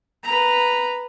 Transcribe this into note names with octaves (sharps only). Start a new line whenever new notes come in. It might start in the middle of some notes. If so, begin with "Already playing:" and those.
B4 A#5